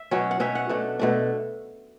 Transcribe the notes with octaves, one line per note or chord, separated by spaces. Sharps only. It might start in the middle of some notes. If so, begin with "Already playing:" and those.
Already playing: E5
B2 F#3 C#4
F#5
B2 F#3 C#4 E5
F#5
B2 A3 D4
B2 A3 D4